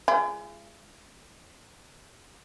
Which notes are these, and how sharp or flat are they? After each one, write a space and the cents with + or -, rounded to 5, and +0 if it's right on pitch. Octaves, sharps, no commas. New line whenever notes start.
G#3 +0 F4 -45